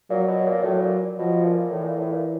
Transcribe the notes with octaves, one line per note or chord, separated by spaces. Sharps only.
A#2 F#3
B2
A#2
A2 F#3
A#2
B2 F3
A#2
A2 E3
A#2
A2
A#2